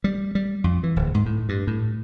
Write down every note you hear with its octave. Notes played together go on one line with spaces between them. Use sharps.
G3
G3
F2
E3
D1
G#2
A2
G2
A2